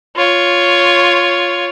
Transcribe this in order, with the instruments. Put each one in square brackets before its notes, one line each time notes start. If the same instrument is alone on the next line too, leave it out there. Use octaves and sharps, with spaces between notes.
[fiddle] F4 C#5